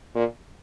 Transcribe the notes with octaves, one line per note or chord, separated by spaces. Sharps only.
A#2